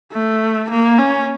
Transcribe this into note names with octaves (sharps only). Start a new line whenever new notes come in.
A3
A#3
C#4